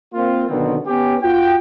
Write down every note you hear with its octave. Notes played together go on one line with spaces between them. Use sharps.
A#3 C4 F4
B2 D3 D#3 F#3 B3 C4
B3 C#4 G4
F4 F#4 G5